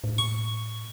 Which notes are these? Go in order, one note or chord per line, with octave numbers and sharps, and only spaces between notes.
A2
C#6